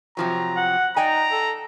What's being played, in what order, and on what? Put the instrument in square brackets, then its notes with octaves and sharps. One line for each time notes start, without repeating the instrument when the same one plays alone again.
[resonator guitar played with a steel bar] C3 F3 F#3 [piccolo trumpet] A#5
[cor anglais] F#5
[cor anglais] D#4 [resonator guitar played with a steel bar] D5 G5 G#5 [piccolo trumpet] A#5
[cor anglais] A4